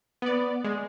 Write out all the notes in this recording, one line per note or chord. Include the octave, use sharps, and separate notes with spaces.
B3 D5
G#3